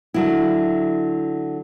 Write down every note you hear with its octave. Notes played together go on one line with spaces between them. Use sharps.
D3 F#3 E4